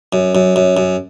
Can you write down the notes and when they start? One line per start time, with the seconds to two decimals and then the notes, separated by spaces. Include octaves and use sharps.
0.13 F#2
0.35 F#2
0.56 F#2
0.77 F#2